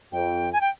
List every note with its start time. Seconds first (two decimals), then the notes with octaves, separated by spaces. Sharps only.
0.12 F2 G5
0.53 G#5
0.61 G5